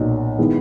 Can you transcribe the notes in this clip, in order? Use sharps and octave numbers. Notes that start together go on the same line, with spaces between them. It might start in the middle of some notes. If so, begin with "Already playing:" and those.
Already playing: B1 A#2 F#3
D#3 G#3 B3 E4